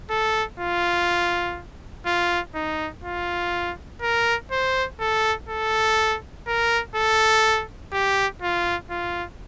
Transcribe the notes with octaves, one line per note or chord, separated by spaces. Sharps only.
A4
F4
F4
D#4
F4
A#4
C5
A4
A4
A#4
A4
G4
F4
F4